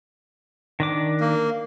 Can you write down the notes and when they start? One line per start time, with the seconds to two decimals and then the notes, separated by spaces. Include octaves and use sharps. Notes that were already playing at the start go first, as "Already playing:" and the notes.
0.80 D#3 D4 D6
1.20 A#3